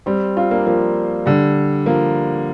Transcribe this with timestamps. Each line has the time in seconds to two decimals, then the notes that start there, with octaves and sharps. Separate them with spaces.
0.06 G3 C4
0.37 C4 F4
0.51 A#3 D4
0.66 F3 A#3
1.26 D3 G3
1.86 F3 A#3